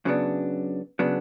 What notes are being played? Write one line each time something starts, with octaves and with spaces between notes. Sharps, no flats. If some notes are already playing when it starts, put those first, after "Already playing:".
F#2 C#3 F#3 B3 D4
C#3 F#3 B3 D4